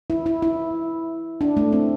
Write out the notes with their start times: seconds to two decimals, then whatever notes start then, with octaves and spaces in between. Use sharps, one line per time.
0.10 E4
0.26 E4
0.42 E4
1.41 D4
1.57 A3
1.73 C4